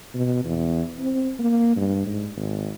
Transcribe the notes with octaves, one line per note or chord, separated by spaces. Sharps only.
B2
E2
C4
A#3
G2
G#2
G#1